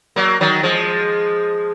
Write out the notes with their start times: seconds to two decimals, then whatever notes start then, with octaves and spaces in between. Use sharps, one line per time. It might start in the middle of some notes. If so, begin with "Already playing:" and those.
0.16 F#3 A#3
0.41 D#3 F#3
0.63 F3 G#3